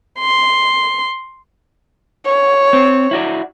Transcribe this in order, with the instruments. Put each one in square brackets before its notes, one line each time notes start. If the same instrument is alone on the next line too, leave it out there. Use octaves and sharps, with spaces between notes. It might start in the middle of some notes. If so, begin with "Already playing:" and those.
[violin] C6
[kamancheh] C#5
[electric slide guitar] C4
E4 F#4 D5